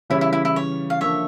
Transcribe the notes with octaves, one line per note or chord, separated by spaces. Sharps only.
C#3 E3 G3 C#4 E4
E4
E4
E4
C#5
F5
D3 F3 A#3 D4 C#5 E5